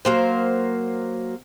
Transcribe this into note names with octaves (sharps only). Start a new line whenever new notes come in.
F#3 A#3 C5